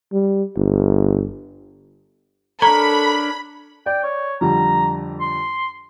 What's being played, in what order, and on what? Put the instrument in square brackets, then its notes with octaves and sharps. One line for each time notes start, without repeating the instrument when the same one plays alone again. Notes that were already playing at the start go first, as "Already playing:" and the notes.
[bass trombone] G3
G1
[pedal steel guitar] D4 A#4 C#5 [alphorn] A4 [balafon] A#5 [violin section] B5
[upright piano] D5 [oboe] G5
[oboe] C#5
[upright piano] F2 D3 G3 [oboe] A#5
[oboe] C6